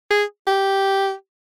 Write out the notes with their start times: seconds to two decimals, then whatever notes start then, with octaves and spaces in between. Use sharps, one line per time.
0.10 G#4
0.47 G4